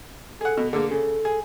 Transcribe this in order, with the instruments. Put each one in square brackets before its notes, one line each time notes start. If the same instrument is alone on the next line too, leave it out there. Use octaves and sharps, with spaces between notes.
[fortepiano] G#4 F#5 [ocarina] A4
[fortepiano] B2
[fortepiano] D3 A#3 [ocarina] G#4
[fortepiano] C#3 [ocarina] A4
[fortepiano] G#4